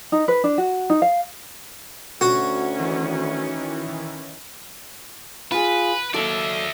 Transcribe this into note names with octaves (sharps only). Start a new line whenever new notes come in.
D#4
B4
D4
F#4
D#4
F5
D2 C#4 F#4
D#3 E3
F4 G#4 B4
D#2 F#3 A4 D5 E5